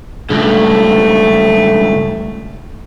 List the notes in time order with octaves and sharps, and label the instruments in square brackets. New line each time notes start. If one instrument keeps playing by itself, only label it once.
[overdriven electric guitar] C#2 G2 [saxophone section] A3